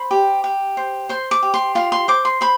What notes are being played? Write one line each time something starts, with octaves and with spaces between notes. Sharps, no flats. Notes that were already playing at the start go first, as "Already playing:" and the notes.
Already playing: C5 B5
G4
G4
C5
C5 C6
D6
G4
C6
F4 C6
C6
C5 D6
C6
C5 B5